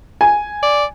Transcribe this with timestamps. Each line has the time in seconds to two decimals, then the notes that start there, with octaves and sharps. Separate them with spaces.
0.21 G#5
0.63 D5